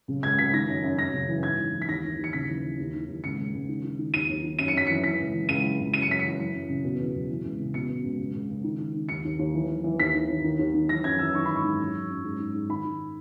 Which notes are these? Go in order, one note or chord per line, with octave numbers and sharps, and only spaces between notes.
C#3
C#2 G#6
C#2 B6
D#3 A#6
F#2
F#2
F#2 A#6
C#3
E3
G#2 G#6
E3
E3
B6
D#2 A#6
D#2
D#2
C#7
C#3 B6
E3
E3
D#2
D#3
D#2
C#2 C#7
C#2
C#2
D#3
D#3
D#3
D#2 D#7
D#2
D#3
F#2 D#7
C#7
F#2 B6
E3 C#7
E3 B6
C#2
E3
C#2 D#7
E3
C#2
F#2 D#7
C#7
F#2 B6
E3 C#7
E3
F#2
C#3
B2
E2
E2
E3
C#2
C#3
B2 C#7
B2
C#2
C#2
C#2
C#2
D#3
D#3
D#3
D#2 C#7
D#2
D#2
E3
E3
E3
D#2 B6
D#3
D#2
D#3
D#2
D#3
E3 A#6
F#2 G#6
E3 E6
D#3 C#6
G#2 B5
C#6
G#2
F#2
F#2
F#2
G#2
G#2
G#2
D#3 B5
D#3